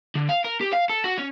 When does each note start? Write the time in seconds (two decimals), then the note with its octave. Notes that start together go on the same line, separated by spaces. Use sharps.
0.15 D3
0.29 F5
0.44 A#4
0.61 G4
0.73 F5
0.90 A4
1.04 F#4
1.18 C#4